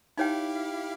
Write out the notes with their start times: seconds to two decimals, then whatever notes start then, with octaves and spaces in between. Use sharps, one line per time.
0.17 D#4 E4 G4 C#5 F5 G5